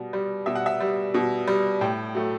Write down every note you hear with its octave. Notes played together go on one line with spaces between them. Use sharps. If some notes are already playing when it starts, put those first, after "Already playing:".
Already playing: B2 G3
G3
B2 E5
F#5
E5
G3
B2
G3
A2 G5
F#3 A3